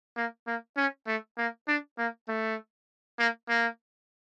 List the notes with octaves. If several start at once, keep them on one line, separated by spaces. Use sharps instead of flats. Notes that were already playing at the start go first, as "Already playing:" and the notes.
A#3
A#3
C#4
A3
A#3
D4
A#3
A3
A#3
A#3